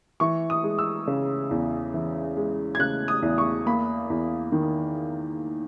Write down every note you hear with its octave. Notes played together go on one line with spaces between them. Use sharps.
E3 C#6
D#6
G#3
E6
C#3
E2
E3
G#3
G#6
C#3 F#6
D#6
E2
C#6
A#3 B5
E2
D#3